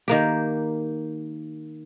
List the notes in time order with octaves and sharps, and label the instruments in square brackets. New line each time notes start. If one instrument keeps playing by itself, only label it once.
[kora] D#3 A#3 G4